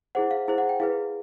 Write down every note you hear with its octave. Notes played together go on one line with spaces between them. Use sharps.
E4 G#4 C5 F#5
F5
E4 G#4 C5
F#5
G5
E4 G#4 B4 F5